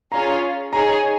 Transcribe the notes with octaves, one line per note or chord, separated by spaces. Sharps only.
C#4 F4 G#4 C#5 A#5
D#4 G#4 C#5 A#5